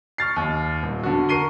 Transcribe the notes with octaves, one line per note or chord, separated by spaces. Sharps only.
C#6 F6 A6 C7
D#2
D#1
D3 F#4
A#4 C#6 C7 D#7 G7